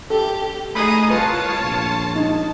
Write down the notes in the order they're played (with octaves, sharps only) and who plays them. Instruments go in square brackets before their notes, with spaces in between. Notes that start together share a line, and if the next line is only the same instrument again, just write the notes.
[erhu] G4 [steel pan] A4
[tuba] A3 [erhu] D#4 [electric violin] G#4 D#6 [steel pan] B5
[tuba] C2 [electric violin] F4 C#5 [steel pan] B4 [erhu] A5
[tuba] A#1
[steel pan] D#4